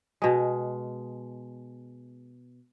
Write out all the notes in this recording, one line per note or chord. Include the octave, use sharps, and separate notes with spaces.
B2 G#3